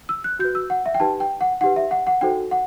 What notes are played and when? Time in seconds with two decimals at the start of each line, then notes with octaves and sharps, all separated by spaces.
0.09 E6
0.24 F#6
0.39 F#4 G6
0.44 B4
0.55 E6
0.70 F#5
0.86 E5
0.94 G5
1.00 D#4 G4 B4 A5
1.20 G5
1.41 F#5
1.61 D#4 G4 B4 F#5
1.76 E5
1.91 F#5
2.07 F#5
2.21 D#4 F#4 A4 C5 G5
2.51 F#5